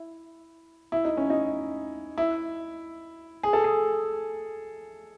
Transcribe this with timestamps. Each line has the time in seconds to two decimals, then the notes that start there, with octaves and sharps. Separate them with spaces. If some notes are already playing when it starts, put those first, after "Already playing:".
Already playing: E4
0.92 E4
1.05 D#4
1.17 C#4
1.30 D#4
2.18 E4
3.43 G#4
3.53 A4
3.64 G#4